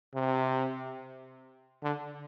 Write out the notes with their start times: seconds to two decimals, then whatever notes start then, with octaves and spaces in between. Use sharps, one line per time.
0.15 C3
1.83 D3